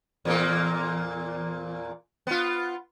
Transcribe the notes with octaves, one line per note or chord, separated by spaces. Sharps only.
E2 A#2 A#3
B3 F4